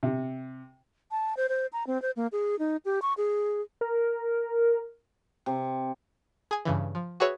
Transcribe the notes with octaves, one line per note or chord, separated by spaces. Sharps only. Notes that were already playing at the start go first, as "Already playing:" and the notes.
C3
A5
C5
C5
A#5
C4
C5
A#3
G#4
D#4
G4
C#6
G#4
A#4
C3
G#4 G#5
G2 C#3 E3
F3
F#4 G#4 B4 C#5 E5